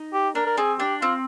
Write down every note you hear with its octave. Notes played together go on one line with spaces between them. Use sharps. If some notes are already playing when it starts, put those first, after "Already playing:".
Already playing: D#4
G4
D4 A#4
A#4
C4 G#4
D4 G4
C4 F4